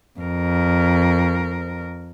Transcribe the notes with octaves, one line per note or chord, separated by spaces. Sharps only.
F2 A#4